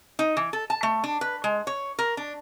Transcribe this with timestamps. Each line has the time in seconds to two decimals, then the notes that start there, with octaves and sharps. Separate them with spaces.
0.19 D#4
0.37 E3
0.53 A4
0.70 A5
0.83 A3
1.04 D4
1.21 B4
1.44 G#3
1.67 C#5
1.99 A#4
2.17 D4